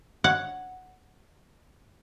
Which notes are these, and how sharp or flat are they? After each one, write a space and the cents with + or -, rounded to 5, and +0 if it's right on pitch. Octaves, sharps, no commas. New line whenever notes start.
C#5 +0 F#5 +0